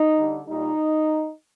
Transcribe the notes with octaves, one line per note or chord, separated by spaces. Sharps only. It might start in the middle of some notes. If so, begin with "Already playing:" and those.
Already playing: D#4
D3 G3
A#2 G3 D#4